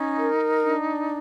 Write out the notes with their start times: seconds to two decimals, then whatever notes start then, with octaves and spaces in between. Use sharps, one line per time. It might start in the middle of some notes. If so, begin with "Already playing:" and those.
Already playing: C#4 D#4
0.17 A#4
0.62 D4